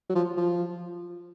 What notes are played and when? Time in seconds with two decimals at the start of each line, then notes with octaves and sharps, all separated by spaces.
0.10 F#3
0.15 F3
0.37 F3